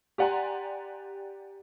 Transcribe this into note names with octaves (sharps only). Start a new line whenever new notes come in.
G4 D5 F#5 G#5 A#5 C6